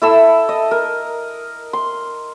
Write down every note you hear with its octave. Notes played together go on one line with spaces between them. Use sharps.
E4 A4 E6
D#5
A#4
C6